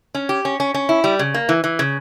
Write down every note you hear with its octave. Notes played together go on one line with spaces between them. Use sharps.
C#4
G4
C#4
C#4
C#4
E4
G3
C#3
A#3
E3
E3
C#3